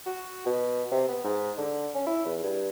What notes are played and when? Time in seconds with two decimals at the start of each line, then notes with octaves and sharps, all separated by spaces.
0.06 F#4
0.46 B2
0.91 C3
1.08 B3
1.24 G#2
1.58 D3
1.95 C#4
2.07 E4
2.26 E2
2.43 G2